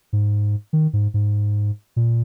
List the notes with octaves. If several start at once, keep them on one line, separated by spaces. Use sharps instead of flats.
G#2
D#3
G#2
G#2
A#2